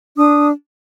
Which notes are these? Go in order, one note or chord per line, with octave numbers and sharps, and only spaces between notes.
D4 D#6